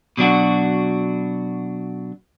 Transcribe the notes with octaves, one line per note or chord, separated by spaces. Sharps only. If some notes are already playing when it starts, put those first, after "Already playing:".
B2 F#3 D4 F#4